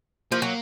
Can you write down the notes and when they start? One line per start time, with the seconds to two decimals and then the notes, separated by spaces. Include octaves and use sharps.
0.32 F3 A#3
0.42 F#3